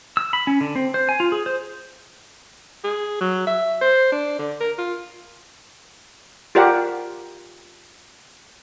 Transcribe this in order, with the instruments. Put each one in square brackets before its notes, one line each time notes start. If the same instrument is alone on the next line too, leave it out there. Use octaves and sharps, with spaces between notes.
[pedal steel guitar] E6
B5
C#4
D3
C4
C5
G#5
F4
G#4
C5
[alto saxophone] G#4
F#3
E5
C5
D4
D3
A#4
F4
[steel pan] F4 G4 A#4 D5 F#5